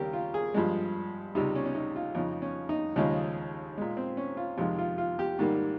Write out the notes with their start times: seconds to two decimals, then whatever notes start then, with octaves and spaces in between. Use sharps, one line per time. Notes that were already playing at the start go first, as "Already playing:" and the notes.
Already playing: D#2 C#3 G3 A#3 G4 A#4
0.13 F4
0.34 G#4
0.54 G2 F3 G#3
1.35 C#2 C3 G3 D#4
1.55 C#4
1.66 C#4
1.75 D#4
1.96 F4
2.15 F2 C#3 F3 D#4
2.42 C#4
2.69 D#4
2.96 D#2 C#3 F3 G#3 D#4
3.78 A#2 G#3
3.97 C4
4.17 C#4
4.37 F4
4.58 F2 C3 D#3 G#3 F4
4.79 F4
4.98 F4
5.19 G4
5.39 G#2 D#3 G3 A#3